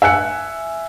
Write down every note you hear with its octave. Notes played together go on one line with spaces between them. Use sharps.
E5 G#5 F#6 C#7